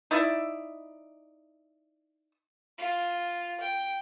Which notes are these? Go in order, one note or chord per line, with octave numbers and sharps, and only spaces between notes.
D#4 E4 D5 E5
F4
G5